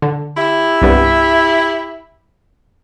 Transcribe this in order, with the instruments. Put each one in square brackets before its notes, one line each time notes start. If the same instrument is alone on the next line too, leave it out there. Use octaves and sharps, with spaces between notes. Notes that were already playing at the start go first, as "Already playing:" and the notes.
[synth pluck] D3
[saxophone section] E4 G4 E5
[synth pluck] C2 G2 B3